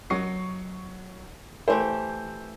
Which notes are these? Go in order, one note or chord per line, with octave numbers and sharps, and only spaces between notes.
F#3 D#5 C#6 C7
E3 A3 G4 C5